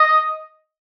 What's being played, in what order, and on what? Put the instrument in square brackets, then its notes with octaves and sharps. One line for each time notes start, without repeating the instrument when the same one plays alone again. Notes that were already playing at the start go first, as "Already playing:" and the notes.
Already playing: [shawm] D#5